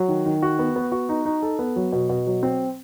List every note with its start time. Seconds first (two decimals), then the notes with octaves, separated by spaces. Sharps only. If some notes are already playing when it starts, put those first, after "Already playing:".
Already playing: F#3
0.08 D#3
0.26 D#3
0.42 F#4
0.59 B3
0.76 B3
0.92 F#4
1.09 D#4
1.26 D#4
1.42 A4
1.59 B3
1.76 F#3
1.93 B2
2.09 B2
2.27 F#3
2.43 C4